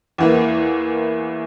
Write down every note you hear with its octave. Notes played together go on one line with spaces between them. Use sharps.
E2 E3 A#3